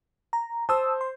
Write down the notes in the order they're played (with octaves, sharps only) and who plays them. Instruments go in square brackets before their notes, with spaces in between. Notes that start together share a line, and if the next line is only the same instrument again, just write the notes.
[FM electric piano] A#5
[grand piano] C5 [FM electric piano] A5 D#6 E6
[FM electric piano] C6